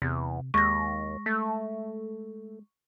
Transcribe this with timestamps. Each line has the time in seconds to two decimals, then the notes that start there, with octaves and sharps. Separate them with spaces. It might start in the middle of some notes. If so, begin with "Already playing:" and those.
0.02 E2 C3
0.54 D#2 G#3 C#6 A#6
1.26 A3